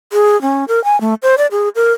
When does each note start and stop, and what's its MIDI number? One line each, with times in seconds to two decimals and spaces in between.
0.13 0.40 68
0.42 0.65 61
0.68 0.83 70
0.84 0.99 80
1.01 1.14 57
1.23 1.35 72
1.38 1.47 74
1.51 1.69 68
1.75 1.92 70